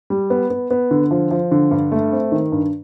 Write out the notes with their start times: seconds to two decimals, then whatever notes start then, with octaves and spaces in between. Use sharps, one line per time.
0.10 G3
0.30 B3
0.50 B3
0.71 B3
0.91 D3
1.11 F3
1.31 F3
1.51 D3
1.71 G2
1.92 A3
2.12 C4
2.32 D#3
2.52 G2